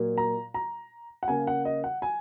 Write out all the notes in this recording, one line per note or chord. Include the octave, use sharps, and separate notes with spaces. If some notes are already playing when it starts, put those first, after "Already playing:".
Already playing: A#2 F#3 A#3
A#5
A#5
F#5
C#3 A#3 G#5
F#5
D#5
F#5
G#5